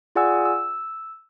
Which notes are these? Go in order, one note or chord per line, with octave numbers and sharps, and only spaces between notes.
F4 G#4 D5 F#5 G#5 E6
E6